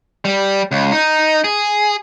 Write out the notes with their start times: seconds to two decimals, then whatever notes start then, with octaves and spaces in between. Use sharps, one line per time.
0.25 G3
0.71 C#2
0.92 D#4
1.44 G#4